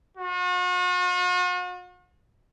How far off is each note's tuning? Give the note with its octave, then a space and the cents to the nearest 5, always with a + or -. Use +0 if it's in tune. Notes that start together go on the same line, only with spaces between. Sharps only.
F#4 -45